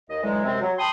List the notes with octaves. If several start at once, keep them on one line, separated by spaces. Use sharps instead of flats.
D#2 D#5
D3 E3 F#3 G#3
F#2 C3 G#3 C4
F#3
G5 A5 B5 C6 D#6